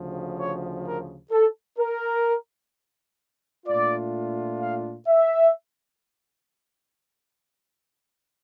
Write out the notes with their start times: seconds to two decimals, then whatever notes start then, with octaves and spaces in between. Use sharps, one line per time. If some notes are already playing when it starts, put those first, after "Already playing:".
Already playing: D2 C#3 F3
0.38 C#5
0.85 A#4
1.32 A4
1.79 A#4
3.66 A#2 A3 D4 F4 D5
4.60 F5
5.08 E5